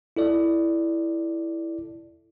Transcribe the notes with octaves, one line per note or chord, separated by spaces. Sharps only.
E4 A4 D5